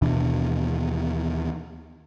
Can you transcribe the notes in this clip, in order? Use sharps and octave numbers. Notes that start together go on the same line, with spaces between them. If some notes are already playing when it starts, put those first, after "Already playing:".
D#2 B2 E3 D4